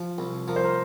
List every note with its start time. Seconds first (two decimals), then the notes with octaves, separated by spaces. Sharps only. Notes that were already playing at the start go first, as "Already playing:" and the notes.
Already playing: F3
0.18 C2
0.48 F3 A#4
0.56 C5
0.64 A#4